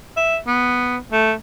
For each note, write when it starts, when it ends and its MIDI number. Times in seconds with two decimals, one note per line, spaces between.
0.17 0.38 76
0.47 0.97 59
1.12 1.34 57